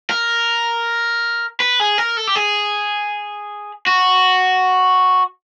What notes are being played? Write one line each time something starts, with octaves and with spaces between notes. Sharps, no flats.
A#4
B4
G#4
A#4
A4
G4
G#4
F#4